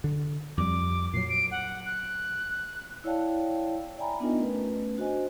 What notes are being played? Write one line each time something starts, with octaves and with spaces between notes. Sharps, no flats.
D3
F2 G3 D6
A#2 F#3 C7
D7
F#5
F#6
E4 C#5 D5 F5 G5 A5
D5 E5 G5 G#5 A#5 B5
B3 D4 D#4 F4 A#4 D#5
A3 C#4 B4
D4 F#4 C5 D#5 G#5